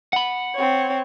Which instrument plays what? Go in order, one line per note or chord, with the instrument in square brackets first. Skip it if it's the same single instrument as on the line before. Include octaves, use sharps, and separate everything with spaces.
[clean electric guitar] F#5 B5
[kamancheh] C4 C#5